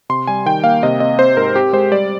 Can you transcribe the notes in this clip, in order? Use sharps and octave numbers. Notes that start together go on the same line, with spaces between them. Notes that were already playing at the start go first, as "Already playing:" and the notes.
C3 C6
G3 G#5
D#3 G5
A#3 F5
C3 D#5
C4 D#5
C4 C5
G#2 A#4
C4 G4
G#3 C5
G3 D5